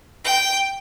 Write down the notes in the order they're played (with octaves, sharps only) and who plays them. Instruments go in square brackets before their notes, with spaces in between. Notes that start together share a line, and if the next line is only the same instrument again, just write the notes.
[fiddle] G5